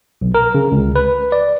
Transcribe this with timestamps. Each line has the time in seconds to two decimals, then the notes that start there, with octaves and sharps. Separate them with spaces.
0.21 B1
0.34 A#4
0.54 C#3
0.72 C#2
0.96 B4
1.32 D5